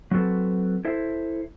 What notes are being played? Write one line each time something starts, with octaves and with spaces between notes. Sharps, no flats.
F#3 C4 F#4 A4 B4
E4 A4 C5 E5